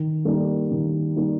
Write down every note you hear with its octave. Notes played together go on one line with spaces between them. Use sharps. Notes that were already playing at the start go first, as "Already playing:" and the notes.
Already playing: D#3
G3 A#3 D#4
D#3
G3 A#3 D#4